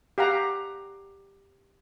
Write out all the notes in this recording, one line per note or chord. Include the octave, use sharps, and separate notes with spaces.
G4 F5 F#5 A#5